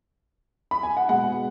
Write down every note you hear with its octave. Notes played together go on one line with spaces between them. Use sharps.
B5
G#5
F#5
B2 G#3 F#5